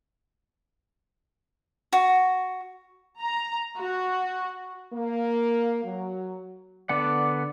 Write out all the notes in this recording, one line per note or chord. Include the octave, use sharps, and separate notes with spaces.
F#4
A#5
F#4
A#3
F#3
D3 B3 D5 F#5